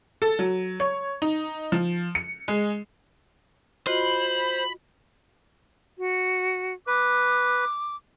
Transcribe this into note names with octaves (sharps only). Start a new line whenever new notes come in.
A4
F#3
C#5
D#4
F3
C#7
G#3
F4 F#4 C5 D#5 B5
F#4
B4 D6